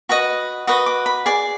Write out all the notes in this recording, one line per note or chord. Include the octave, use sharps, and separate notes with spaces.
F#4 B4 D#5 B5
F#4 B4 D#5 D#6
D6
B5
G#4 D5 D6